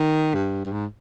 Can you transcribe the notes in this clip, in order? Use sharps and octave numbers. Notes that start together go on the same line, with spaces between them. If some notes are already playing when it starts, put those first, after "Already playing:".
Already playing: D#3
G2
G2
G#2